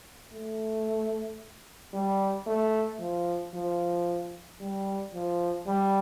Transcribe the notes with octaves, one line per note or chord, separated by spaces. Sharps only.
A3
G3
A3
F3
F3
G3
F3
G3